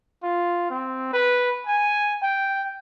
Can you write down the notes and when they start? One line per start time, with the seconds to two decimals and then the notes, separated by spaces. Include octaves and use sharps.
0.23 F4
0.70 C4
1.13 B4
1.67 G#5
2.23 G5